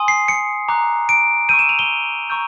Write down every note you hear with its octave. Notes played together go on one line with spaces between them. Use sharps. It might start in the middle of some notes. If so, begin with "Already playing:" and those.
Already playing: G#5 C6 D#6
C7
C#7
A#5 D6 F#6
D7
C#6 E6 G6 D#7
E7
F7
G7
A#5 C#6 E6 G6